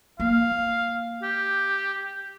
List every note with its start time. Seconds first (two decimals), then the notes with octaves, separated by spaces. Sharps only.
0.20 A#3 F5
1.23 G4